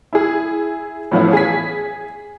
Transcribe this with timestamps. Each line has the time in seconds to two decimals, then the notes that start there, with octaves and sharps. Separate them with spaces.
0.13 E4 G#4
1.11 A2 E3 F3 B3 C#4 E4
1.33 G#4 G#5 B6